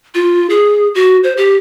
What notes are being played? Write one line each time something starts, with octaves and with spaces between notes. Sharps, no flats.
F4
G#4
F#4
C5
G4